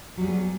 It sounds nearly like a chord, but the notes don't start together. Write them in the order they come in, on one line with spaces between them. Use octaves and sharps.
F#3 G3 G#4 B3